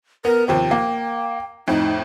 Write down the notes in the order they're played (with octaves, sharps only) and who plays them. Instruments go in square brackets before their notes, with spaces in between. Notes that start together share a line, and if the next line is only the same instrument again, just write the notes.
[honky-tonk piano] B3 [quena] A#4
[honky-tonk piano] D#2 C3 F3 [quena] G5
[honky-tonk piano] A#3
[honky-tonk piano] F2 A2 [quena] D#4